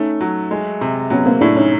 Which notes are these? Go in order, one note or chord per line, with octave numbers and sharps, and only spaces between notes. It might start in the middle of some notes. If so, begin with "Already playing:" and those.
Already playing: A3 C#4 D#4
F#3
G#3
C3
F#3 B3 C#4
A#3 C4
A2 D4 E4
C#4 D#4